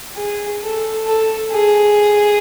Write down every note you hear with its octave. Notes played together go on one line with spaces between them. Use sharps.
G#4
A4
A4
G#4